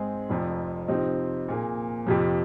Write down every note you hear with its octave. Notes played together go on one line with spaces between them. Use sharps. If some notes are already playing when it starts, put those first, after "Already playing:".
Already playing: G#2 G#3 C4 G#4
F1 F2 F3
C3 F3 C4 D#4
A#2 A#3 G#4
F2 C3 F3